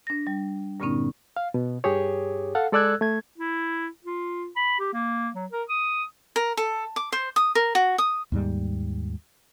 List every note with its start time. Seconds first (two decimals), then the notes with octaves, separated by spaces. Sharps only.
0.07 D4 A#6
0.27 G3
0.80 G2 A#2 D3 B3 C#4 D#4
1.37 F5
1.54 B2
1.84 G2 G4 G#4 C#5
2.55 A4 F5 F#5
2.72 G#3 A4 D5 E6 F#6 G#6
3.01 A3 G#6
3.38 E4
4.04 F4
4.56 B5
4.79 G4
4.93 A#3
5.35 F#3
5.52 A#4
5.69 D#6
6.36 A#4
6.57 A4
6.96 D6
7.12 C5
7.36 D#6
7.55 A#4
7.75 F#4
7.98 D#6
8.32 D#2 G#2 G3